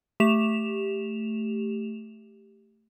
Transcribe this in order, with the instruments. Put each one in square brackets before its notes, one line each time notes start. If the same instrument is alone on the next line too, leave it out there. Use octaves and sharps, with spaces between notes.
[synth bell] A3 G4 E7 F7